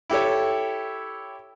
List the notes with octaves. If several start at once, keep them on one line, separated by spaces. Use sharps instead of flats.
E4 G4 A4 C#5